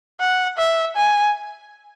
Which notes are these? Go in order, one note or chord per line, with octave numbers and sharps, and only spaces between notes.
F#5
E5
G#5